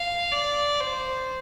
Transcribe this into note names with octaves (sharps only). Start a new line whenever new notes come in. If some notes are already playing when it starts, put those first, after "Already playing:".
Already playing: F5
D5
C5